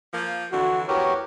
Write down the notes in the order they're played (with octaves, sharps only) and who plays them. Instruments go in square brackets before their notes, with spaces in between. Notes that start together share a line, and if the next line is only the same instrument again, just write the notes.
[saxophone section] F3 A#3
[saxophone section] F2 D3 E3 [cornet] F#4
[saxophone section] E2 B3 [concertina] F#4 G4 A#4 [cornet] C#5